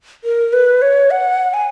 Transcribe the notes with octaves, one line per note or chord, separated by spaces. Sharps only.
A#4
B4
C#5
F#5
G#5